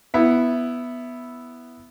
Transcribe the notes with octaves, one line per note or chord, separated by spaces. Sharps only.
B3 E4 E5